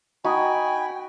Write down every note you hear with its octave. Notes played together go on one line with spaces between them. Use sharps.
D#4 F#4 G5 G#5 B5